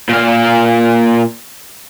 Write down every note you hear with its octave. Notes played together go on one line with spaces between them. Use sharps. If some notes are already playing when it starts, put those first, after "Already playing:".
A#2 F5